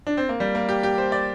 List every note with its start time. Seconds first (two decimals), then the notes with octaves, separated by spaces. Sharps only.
0.07 D4
0.17 C4
0.29 A#3
0.40 G3
0.55 A#3
0.69 G4
0.83 G4
0.98 C5
1.12 D5